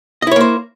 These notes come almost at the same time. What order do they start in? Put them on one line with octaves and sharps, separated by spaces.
D#5 E4 C#5 A#3 C5